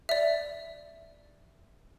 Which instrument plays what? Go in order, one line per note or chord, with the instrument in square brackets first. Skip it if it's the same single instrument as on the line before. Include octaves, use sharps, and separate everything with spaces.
[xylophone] D5 E5